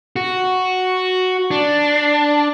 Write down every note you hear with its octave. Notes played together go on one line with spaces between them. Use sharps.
F#4
D4